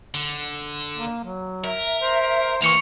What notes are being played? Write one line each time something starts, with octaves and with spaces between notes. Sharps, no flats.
D3
A#3
F#3
A#4 E5
C5
E3 A#3 C4 C#6 C#7 F7